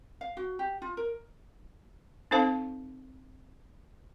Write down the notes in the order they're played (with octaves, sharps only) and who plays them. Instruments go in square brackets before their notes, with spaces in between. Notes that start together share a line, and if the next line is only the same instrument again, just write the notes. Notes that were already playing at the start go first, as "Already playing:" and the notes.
[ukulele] F5
F#4
G4
F4
A#4
[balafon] C4 D#4 A4 C5 F5 A5